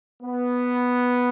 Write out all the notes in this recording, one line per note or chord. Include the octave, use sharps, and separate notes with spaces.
B3